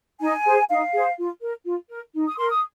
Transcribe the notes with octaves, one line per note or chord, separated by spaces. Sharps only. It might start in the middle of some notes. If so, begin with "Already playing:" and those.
D#4 G#5
G#4 C5
D#4 F5
G#4 C5
F4
A#4
F4
A#4
D#4
D#6
A#4 C6
D#6